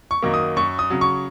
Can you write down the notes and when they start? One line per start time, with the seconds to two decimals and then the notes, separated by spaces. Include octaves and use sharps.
0.11 C#6
0.23 F#2 D#3 F#3 A#3
0.34 D#6
0.56 F#2 C#6
0.79 D#6
0.90 C#3 F#3
1.01 C#6